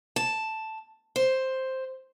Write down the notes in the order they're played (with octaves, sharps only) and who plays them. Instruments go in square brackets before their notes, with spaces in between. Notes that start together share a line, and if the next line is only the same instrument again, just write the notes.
[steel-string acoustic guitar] A5
C5